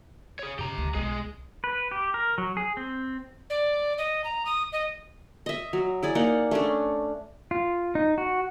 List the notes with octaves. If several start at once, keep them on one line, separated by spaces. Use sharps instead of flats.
G#4 C#5
C#3 G4 A#5
D2
B1 G#3 F4 G#4
B4
G4
A#4
F#3
G#4
C4
D5
D#5
A#5
D#6
D#5
D#5 E5
F#3
E4 G#4 D5
A#3 D#4 D5 F#5
A3 C#4 D4
F4
D#4
F#4